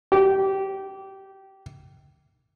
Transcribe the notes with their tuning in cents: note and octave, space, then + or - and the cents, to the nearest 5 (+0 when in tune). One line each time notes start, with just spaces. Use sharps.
G4 -20